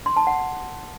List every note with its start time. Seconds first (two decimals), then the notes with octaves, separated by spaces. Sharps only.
0.06 C6
0.16 A5
0.27 F#5